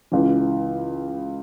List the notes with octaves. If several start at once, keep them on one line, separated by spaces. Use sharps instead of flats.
C#2 C#3 E3